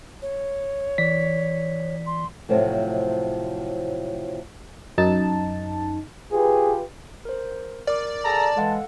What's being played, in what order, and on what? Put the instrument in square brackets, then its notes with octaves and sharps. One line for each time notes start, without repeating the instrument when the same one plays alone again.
[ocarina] C#5
[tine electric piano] E3 D5 B6
[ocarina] C6
[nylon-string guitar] A2 C3 F3 F#3 A3
[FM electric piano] F#2 D#4 A5
[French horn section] F4 G4 B4 [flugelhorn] G#4
[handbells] A#4 C5
[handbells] A#4 D6 [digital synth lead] D5
[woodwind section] G#4 A4 A#5 [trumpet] A5
[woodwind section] E3 G#3 [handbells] A4 F5 F#5